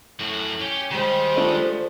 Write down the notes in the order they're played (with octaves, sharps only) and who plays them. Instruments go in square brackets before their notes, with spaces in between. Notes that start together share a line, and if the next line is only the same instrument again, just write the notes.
[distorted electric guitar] F#2 F#4 [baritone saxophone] A2
[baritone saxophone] C#4 [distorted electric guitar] G4 G5
[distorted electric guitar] D#3 [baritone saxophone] G3 [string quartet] G#3 C5
[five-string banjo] A3 D4 F4